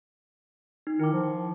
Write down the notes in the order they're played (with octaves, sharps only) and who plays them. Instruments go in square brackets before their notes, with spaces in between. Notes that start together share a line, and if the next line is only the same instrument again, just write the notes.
[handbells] D#4
[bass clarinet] D#3 [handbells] E4 D6
[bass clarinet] F3